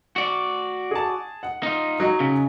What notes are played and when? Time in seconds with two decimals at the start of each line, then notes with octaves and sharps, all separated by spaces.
0.16 F#4 D5
0.91 G#4 A5
1.43 F#5
1.63 D#4 F4
2.00 F#3 D#4
2.20 C#3